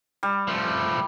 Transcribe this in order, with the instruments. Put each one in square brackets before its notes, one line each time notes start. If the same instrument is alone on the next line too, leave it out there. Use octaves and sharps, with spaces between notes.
[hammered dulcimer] G3
[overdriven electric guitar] F3 A3